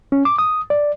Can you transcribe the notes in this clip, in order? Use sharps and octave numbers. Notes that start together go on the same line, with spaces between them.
C#4
D6
D#6
D5